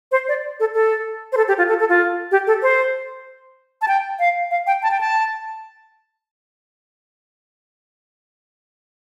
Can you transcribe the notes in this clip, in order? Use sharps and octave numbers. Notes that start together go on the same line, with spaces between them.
C5
D5
A4
A4
C5
A4
G4
F4
A4
A4
F4
G4
A4
C5
A5
G5
F5
F5
G5
A5
G5
A5